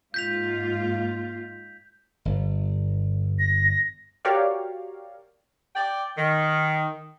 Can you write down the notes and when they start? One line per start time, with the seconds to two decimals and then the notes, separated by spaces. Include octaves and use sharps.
0.14 G#2 A#3 F4 G6 B6 F7
2.25 G1
3.39 A#6
4.25 F#4 G4 A#4 C#5 D5 F5
5.76 D5 G5
6.18 D#3